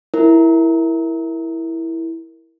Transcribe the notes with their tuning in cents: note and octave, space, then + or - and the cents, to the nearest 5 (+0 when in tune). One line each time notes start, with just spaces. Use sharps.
E4 +0 A#4 +0